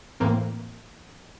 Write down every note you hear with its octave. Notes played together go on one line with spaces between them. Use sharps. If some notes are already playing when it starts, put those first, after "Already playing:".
A2 E3 A#3 C4